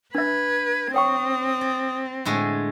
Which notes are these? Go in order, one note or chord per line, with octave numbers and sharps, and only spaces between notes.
D4 B4 E5 G#6
C4 C#5 G5 C#6 D#6
D5
A2 D3 G#3